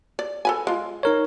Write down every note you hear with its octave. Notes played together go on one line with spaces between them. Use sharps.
D5
A4 B4 G#5
G#3 F4
D#4 A#4 C#5